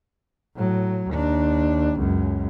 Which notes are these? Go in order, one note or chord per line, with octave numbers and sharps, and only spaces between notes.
A2 F#3
D#2 D4
C#2 F#2